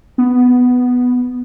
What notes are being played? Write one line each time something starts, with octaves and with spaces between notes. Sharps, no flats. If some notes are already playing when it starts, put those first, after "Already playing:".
B3